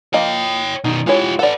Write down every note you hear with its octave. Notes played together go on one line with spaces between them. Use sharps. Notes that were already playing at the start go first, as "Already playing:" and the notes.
F3 A#3 C#5 D#5 G5
B2 D#3 D#4
G#3 E4 F4 G4 C#5
A4 B4 D5 F#5